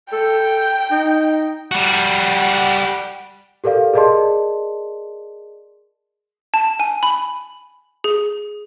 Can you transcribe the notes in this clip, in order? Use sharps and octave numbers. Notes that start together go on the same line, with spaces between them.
A4 G5
D#4
G3 F#4 F#5
G4 A4 A#4 D5 F5
G#4 A#4 D5 D#5 A5 C6
A5
G#5
B5
G#4